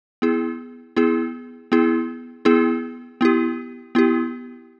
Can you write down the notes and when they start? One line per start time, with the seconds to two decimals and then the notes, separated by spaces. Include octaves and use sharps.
0.22 B3 E4 G#4
0.96 B3 E4 G#4
1.72 B3 E4 G#4
2.45 B3 E4 G#4
3.21 B3 E4 G4
3.95 B3 E4 G4